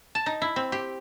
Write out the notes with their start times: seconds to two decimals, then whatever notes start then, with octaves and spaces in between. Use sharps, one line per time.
0.15 A5
0.26 D#4
0.42 E4
0.56 C4
0.72 G4